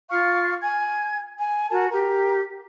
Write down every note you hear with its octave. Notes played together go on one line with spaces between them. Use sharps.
F4 F5 C#6 F6
G#5 G#6
G#5
F#4 A#4 G#5 A5
G4 A#4